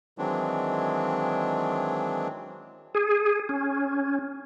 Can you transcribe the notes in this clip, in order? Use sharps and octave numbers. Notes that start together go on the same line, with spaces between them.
D#3 E3 F#3 G#3 C4 D4
G#4
C#4